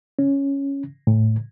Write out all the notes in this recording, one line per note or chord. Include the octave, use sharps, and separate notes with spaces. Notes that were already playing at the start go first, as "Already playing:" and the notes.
C#4
A2